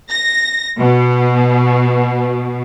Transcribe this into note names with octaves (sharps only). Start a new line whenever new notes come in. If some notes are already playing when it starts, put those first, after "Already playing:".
A#6
B2